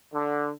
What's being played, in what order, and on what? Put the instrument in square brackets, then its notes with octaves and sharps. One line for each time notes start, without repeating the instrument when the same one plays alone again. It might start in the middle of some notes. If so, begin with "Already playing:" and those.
[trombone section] D3